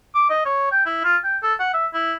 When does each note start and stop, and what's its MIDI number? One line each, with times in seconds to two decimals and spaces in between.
0.15 0.29 86
0.30 0.44 75
0.46 0.71 73
0.71 0.84 79
0.86 1.02 64
1.04 1.17 65
1.24 1.37 79
1.43 1.54 69
1.60 1.72 78
1.74 1.87 76
1.94 2.15 64